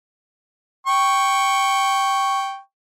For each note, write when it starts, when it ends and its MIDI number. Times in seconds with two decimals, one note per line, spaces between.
0.87 2.59 79
0.87 2.59 85